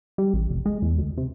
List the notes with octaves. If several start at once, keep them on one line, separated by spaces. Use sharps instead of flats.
G3
A1
F1
G#3
E2
D2
C3